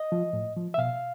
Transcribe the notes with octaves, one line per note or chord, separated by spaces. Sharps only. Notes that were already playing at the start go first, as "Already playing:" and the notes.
Already playing: D#5
F3
A2
F3
E5
B2 F5